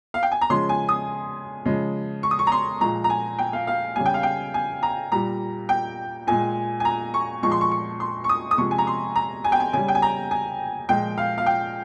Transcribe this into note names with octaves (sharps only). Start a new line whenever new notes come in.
F5
G5
G#5
A#5
C#3 F3 G#3 C6
G#5
D#6
C#3 F3 G#3
C#6
D#6
C#6
A#5
C6
A#2 F3 G#3 A#5
A#5
G#5
G5
F5
F5
C#3 G3 G#5
G5
F5
G5
G#5
A#5
A#2 G3 A#5
G5
A#2 G#3 G#5
G#5
A#5
C#6
A#2 F3 G#3 C#6
C6
C#6
C#6
C6
C#6
D#6
D#6
C3 F3 G#3 C#6
G#5
A#5
C6
A#5
G#5
G5
G#5
C#3 G3 G#5
G5
G#5
A#5
G#5
A#2 F3 G#3 G5
F5
F5
G5